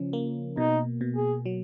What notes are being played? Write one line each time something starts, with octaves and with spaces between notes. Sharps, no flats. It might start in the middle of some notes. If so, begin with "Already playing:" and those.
Already playing: C#3 F3 C#4
A#3
B2 D#4
B2
G#4
F#3